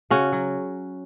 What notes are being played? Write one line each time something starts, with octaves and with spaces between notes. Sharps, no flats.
C#3 C#4 F#4
F#3